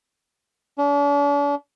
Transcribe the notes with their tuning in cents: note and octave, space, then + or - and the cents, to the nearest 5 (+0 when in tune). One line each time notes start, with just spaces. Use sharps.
D4 -45